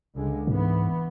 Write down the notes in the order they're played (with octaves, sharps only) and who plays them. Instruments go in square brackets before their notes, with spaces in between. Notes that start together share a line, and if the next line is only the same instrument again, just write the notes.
[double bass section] C#2 D3 G#3
[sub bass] G#2 [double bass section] E3 B3